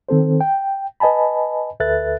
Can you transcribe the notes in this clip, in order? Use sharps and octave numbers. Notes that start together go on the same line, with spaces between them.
D#3 C4 A4 C5
G5
B4 D#5 G#5 A5 B5
D2 A4 B4 E5 F#6 A6